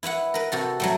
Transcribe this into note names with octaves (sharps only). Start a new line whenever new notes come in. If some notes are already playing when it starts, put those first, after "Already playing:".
E4 B4 E5 F#5
A#4 B4
C3 F#4 A4
F#3 G3 A3